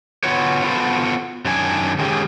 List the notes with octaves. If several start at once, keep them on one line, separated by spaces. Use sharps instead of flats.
B3 F4 F#4 B4 C#5
B3 F4 F#4 A4 A#4 C5
F#2 D#3 D4 G#5
D#3 G#3 C#4 G4 G#4